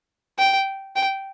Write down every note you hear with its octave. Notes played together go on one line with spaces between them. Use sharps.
G5
G5